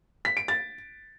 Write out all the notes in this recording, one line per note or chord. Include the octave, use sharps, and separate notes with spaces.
B6
D7
A6